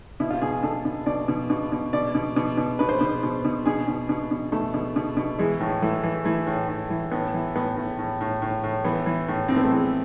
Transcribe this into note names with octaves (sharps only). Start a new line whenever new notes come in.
B2 E4
F4
B2 G#4
G#4
B2 A4
B2
B2 D5
B2
B2
B2
B2 D5
B2
B2
B2
B2 B4
C5
B2 B4
B2
B2
B2 G#4
B2
B2
B2
B2 A3
B2
B2
B2
E3 G#3
A2
E3 A3
E3
E3 A3
A2
A2
E3
A2 B3
E3
A2 B3
A2
A2
A2
A2
A2
E3 B3
E3
A2
A2 C4
B3
A3
E3 G#3